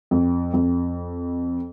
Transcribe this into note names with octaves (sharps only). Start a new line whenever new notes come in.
F2
F2